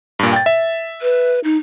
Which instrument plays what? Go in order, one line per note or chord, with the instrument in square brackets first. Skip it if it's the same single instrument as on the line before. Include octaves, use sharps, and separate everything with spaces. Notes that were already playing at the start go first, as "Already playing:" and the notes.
[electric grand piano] G2 A#2
G5 A6
E5
[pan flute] B4
D#4